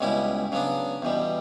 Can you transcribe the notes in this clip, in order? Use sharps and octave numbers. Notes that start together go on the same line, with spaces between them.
C#2 B2 G3 C#4 E4
C#3 F#3 B3 D4
E2 B2 G3